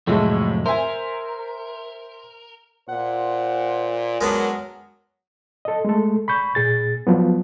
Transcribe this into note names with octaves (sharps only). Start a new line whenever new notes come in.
F2 A2 C3 F#3 G#3 A3
A#4 C5 E5 G#5
A#2 C5 F#5
F#3 G#3 B3 D4 A#4
A4 D#5
G#3 A3 A4
B5 C#6 G6
A#2 G#4 A6
F3 F#3 B3